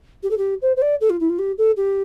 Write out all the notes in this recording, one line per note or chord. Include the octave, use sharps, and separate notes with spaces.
G4
A4
G4
C5
C5
D5
A4
F4
E4
F4
G4
A4
G4